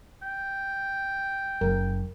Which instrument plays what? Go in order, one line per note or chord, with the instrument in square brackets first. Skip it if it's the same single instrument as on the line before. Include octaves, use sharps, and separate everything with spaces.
[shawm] G5
[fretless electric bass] F#1 F#2 [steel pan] A#4